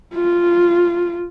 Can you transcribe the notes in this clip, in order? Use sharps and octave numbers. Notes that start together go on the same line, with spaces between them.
F4